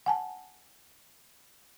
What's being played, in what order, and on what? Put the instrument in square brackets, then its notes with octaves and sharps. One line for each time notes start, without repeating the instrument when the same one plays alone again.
[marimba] F#5 G#5 A5